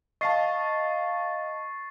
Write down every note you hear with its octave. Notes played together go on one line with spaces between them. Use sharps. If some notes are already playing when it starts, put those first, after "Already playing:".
D#5 F5 A5 C#6 A6 C7